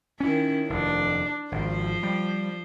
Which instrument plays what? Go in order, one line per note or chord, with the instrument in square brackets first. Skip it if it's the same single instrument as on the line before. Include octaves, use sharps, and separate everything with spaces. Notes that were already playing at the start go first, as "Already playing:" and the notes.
[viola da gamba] D#3 E4 [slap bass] C#4
[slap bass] F1 D#2 [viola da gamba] D4
[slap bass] G#1 [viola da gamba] F3 C5
[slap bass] G3